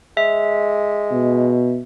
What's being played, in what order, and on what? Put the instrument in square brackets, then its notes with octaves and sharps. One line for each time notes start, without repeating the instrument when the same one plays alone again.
[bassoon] G#3 [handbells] E5
[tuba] B2